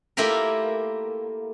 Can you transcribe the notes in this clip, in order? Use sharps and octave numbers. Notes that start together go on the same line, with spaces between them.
A3 A#3 E4 F4 G4 A#4